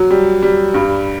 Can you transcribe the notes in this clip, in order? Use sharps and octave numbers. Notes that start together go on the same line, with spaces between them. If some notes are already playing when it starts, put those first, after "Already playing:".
Already playing: F#3
G3
G3
G2